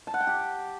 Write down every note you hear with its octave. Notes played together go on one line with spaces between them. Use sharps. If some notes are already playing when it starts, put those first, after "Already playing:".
A5
F#5
G5
G4